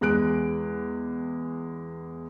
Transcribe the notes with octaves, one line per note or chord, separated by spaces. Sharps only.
E2 G#3 F#6 D7